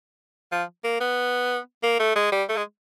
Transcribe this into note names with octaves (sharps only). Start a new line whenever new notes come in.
F3
A#3
B3
A#3
A3
G#3
G3
A3
G#3